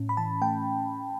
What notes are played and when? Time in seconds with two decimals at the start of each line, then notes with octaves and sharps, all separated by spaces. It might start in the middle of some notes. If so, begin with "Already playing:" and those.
Already playing: A2 C#4
0.09 B5
0.17 E3 A5
0.42 A3 G5